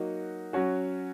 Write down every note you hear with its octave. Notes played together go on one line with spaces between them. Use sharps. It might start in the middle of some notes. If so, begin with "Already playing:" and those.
Already playing: F#3 A#3 D#4 F#4
F#3 C#4 F#4